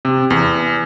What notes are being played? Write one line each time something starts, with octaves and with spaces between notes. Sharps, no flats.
C3
E2